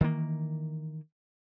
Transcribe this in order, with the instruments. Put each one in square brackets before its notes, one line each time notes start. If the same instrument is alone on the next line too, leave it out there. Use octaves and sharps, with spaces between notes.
[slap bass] D#3 E3 A3 A#3